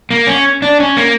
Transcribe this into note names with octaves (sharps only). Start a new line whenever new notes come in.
A#3
C#4
D4
C#4
A#3